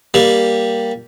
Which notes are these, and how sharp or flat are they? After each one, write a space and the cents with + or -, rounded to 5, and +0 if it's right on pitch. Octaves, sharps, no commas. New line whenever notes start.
G3 +0 A#3 +0